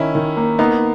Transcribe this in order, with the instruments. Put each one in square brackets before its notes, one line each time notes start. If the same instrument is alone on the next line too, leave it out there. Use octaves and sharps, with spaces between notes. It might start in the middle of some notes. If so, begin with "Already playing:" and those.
Already playing: [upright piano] D#3 D#4 [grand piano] C#4 E4
[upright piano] D#3
A#3
[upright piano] A#3 [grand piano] B3 D#4